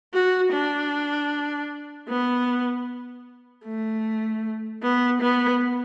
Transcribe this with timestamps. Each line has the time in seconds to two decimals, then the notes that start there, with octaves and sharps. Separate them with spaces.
0.13 F#4
0.52 D4
2.09 B3
3.65 A3
4.82 B3
5.21 B3